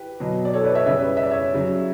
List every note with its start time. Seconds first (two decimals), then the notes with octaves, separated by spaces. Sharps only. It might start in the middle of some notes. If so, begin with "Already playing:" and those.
Already playing: G4 B4
0.20 B2 F#3
0.45 D5
0.54 A4 C#5
0.64 B4 D5
0.75 C#5 E5
0.86 C#3 G3 C#5 E5
0.97 B4 D5
1.17 E5
1.23 D5
1.30 C#5 E5
1.54 C#3 F#3